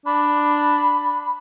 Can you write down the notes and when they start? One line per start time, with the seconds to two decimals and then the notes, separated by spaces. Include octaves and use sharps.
0.06 D4 B5